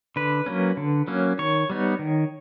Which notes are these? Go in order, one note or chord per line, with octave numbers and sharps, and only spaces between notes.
D3 B4
F#3 A#3 C#4
D3
F#3 A#3 C#4
D#3 C#5
G3 B3 D#4
D#3